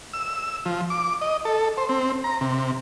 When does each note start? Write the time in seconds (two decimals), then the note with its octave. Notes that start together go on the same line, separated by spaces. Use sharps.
0.14 E6
0.66 F3
0.90 D6
1.21 D#5
1.45 A4
1.77 C5
1.89 C4
2.24 A#5
2.41 C3